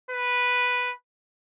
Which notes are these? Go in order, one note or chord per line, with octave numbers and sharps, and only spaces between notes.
B4